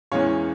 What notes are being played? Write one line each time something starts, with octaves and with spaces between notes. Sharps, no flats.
E2 E3 G#3 C#4 C#5 F5